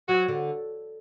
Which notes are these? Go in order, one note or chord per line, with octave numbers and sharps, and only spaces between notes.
F#3 F#4
D3